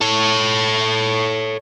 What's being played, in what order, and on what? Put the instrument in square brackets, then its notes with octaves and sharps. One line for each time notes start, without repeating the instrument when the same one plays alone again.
[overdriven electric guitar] A4 C#5